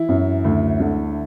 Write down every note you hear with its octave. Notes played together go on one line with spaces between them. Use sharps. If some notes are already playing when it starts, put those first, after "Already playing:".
Already playing: E3 E4
F#2
D2
D3